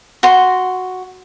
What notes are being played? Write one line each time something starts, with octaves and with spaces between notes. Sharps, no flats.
F#4 C6